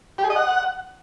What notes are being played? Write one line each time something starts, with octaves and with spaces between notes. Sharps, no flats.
G4
G#4
D#5
F#5